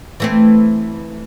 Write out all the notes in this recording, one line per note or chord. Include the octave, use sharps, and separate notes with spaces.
E3 A3 C4